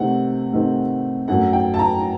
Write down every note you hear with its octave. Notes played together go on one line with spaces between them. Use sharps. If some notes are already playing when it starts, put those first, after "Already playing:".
Already playing: C3 D#3 A3 C4 F#5
C3 D#3 A3 C4
F#2 F#3 A3 F#5
G5
A5
A#5